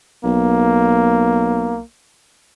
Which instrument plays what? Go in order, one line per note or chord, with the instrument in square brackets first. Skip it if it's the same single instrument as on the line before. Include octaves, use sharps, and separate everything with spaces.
[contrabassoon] B1 [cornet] A#3